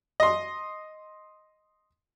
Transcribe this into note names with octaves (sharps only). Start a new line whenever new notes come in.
D#5 C6